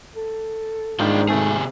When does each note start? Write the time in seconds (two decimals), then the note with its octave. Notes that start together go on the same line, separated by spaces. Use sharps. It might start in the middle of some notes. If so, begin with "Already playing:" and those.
0.16 A4
1.00 G#2 D#3 G3 D4 F4 G5
1.29 G#1 C3 A3 G#4 G5